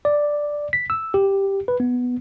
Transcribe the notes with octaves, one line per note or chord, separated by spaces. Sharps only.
D5
B6
E6
G4
B4
B3